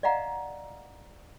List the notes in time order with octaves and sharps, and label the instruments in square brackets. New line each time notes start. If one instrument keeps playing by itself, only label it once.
[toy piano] D5 D#5 F5 F#5 A#5